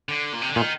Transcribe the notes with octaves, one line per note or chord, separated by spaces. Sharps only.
D3
A#2
C3
D3
A#2 D#3